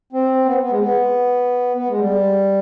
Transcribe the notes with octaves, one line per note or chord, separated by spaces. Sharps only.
C4
B3
B3
G#3
B3
B3
G#3
G3